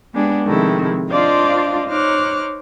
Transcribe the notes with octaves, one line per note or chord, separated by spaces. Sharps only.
G#3 B3 D4 G4 G#4
C3 D#3 F3 G#3 A3 E4
D4 F4 C5 D5 D#5 F5
D#4 C5 C#5 D6 F6 F#6